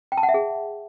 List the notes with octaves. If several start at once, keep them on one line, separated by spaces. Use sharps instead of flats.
G5
A5
F#5
E5
G#4